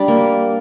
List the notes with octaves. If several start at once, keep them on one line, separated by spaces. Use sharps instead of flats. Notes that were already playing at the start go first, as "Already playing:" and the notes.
Already playing: G3 D4
A#3